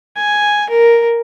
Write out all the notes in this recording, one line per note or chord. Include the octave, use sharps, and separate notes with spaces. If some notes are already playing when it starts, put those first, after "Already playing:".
G#5
A#4